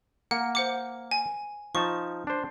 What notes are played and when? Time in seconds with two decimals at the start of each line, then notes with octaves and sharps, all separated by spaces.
0.31 A#3 F#5
0.55 C5 F#5 D6
1.11 G#5
1.75 F3 D#4 A5 C#6
2.27 D4 C5